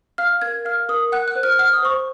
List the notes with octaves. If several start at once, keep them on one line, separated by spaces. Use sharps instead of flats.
F5 F6
A#4 G#6
F5 F6
A#4 D#6
F#5 F#6
F#6
C5
F6
F#5 F6
D#6
C5 C#6